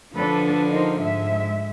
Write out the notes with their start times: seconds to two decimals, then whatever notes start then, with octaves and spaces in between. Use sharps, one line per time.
0.14 D3 F3 D4 A4 B4
0.70 D#4 A#4 C5
1.01 G#2 G#3 E5